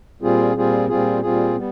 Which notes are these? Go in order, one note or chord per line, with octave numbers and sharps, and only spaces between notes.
A#2 G3 C4 F4 G#4
A#2 G3 C4 F4 G#4
A#2 G3 C4 F4 G#4
A#2 G3 C4 F4 G#4
G3 B3